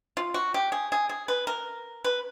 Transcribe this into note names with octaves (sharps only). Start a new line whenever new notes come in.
F4
F#4
G4
G#4
G#4
G#4
B4
A#4
B4